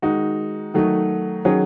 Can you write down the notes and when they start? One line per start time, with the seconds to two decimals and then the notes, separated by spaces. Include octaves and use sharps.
0.02 D#3 G#3 D#4 F#4
0.74 D#3 F#3 A3 D#4
1.45 D#3 F#3 C#4 G#4